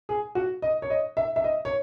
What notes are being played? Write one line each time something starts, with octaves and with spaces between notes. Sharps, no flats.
G#4
F#4
D#5
C#5
D#5
E5
E5
D#5
C#5